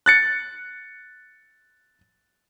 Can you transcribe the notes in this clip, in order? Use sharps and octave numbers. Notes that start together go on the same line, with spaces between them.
F#6 A6 C#7